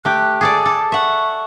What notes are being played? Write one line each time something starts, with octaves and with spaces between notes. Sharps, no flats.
A3 G4 F#6
G#4 A4 D5 D6
A4
E5 F#5 C#6